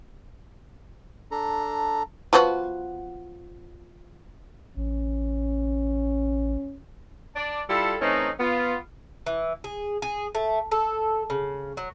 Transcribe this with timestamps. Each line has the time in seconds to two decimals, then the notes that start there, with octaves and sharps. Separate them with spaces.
1.31 D4 A4 A#5
2.33 F3 B3 F#4
4.77 A1 C#4
7.36 D4 D5 A5
7.70 G3 E4 F4 A4
8.01 E3 A3 C4 C#4 D#4
8.40 B3 F4
9.26 E3
9.64 G#4
10.02 G#4
10.35 A3
10.71 A4
11.30 C#3
11.77 F#3